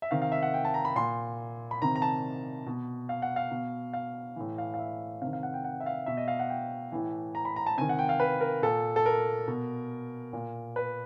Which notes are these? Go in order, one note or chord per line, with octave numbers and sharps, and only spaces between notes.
E5
C3 D#3 F5
F5
E5
F#5
G5
A5
A#5
B5
A#2 C6
B5
C3 D#3 A#5
A#5
A5
B2
F5
F#5
F5
B2
F5
A2 E3
F5
F5
E5
C3 D#3 F5
F5
F#5
G5
F#5
E5
F5
B2 E5
D#5
F5
F#5
G5
A2 E3
A#5
B5
A#5
A5
C3 D#3 G#5
F#5
G5
F5
B4
A#4
A#2 A4
A4
A#4
B2
A#2
B4